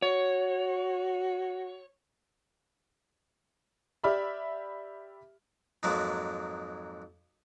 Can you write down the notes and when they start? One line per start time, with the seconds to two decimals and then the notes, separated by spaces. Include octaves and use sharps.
0.02 F#4 C#5
4.04 G4 D5 E5 B5 F6
5.83 F2 G#2 F#3 G#3 A#3